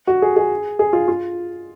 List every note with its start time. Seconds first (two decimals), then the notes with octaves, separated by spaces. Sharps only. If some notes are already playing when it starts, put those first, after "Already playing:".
0.07 F#4
0.22 G#4
0.36 G#4
0.79 G#4
0.93 F4
1.08 F4